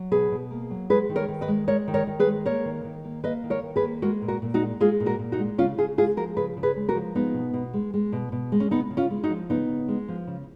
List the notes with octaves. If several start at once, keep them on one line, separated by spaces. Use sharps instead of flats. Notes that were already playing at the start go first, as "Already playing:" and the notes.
Already playing: F#3
B2 G#4 B4
B2
A#3
F#3
G#3 G#4 B4
D#3
A#4 C#5
D#3
B4 D#5
G#3
G#3 A#4 C#5
D#3
A#4 C#5
D#3
G#4 B4
G#3
A#3 A#4 C#5
D#3
D#3
A#3
A#3 B4 D#5
D#3
A#4 C#5
D#3
G#4 B4
A#3
G#3 F#4 A#4
A#2
F#4 A#4
A#2
D#4 F#4
G#3
G#3 F4 G#4
A#2
F#4 A#4
A#2
D#4 F#4
G#3
C#3 C#4 F4
C#3 F4 G#4
G#3 F4 G#4
F3 F#4 A#4
C#3 G#4 B4
C#3
G#4 B4
G#3
F#4 A#4
F3
G#3 B3 D#4
B2
B2
G#3
G#3
B2
B2
G#3
C#4
C#3 B3 D#4
C#3
C#4 F4
G#3
D#4 F#4
F3
C#3 B3 D#4
C#3
G#3
F3
C#3